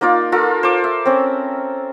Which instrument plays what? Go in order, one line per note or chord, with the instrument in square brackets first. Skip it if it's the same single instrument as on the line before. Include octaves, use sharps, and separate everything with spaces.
[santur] A#3 D#4 F4 D5
F4 A4 A#4
C5 D6
E5
C4 C#4